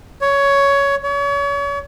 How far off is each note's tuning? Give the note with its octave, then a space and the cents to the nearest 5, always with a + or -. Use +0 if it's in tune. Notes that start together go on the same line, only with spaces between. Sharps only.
C#5 +15
C#5 +35